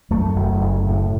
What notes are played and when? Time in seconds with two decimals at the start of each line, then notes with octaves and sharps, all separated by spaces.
0.11 F#2 A3
0.36 F#1
0.62 F#1
0.87 A2